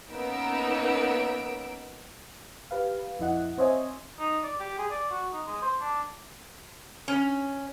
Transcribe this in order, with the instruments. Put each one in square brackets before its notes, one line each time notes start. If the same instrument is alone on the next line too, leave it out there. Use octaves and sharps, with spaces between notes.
[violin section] A#3 B3 C#4 D#4 E6 D7
[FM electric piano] G4 B4 F5
F2 A#2 E4 D#5 F#5 F#6
C4 C5 C#5 D#5 E5 G#5
[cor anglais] D#4
D5
G4
G#4
D5
F#4
D#4
G#3
C5
D4
[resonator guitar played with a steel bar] C#4